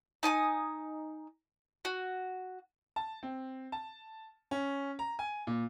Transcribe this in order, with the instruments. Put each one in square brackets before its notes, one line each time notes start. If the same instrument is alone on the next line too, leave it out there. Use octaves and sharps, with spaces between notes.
[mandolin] D#4 G#5 A5 D#6
F#4
[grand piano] A5
C4
A5
C#4
A#5
G#5
A#2